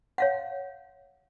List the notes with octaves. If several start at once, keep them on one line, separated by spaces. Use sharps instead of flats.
C#5 F5 F#5